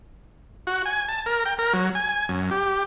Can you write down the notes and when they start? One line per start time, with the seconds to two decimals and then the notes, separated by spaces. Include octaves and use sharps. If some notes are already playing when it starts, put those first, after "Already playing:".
0.67 F#4
0.86 G#5
1.09 A5
1.26 A#4
1.46 G5
1.58 A#4
1.73 F#3
1.95 G#5
2.09 G#5
2.29 F#2
2.51 G4